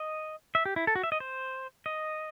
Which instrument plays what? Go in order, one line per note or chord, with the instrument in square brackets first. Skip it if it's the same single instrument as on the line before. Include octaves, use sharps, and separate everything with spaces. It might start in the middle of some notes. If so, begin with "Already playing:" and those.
Already playing: [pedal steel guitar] D#5
E5
G4
E4
A4
F#4
E5
D#5
C5
D#5